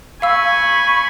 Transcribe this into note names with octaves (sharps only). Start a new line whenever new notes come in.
F5 G#5 B5 C#6 E6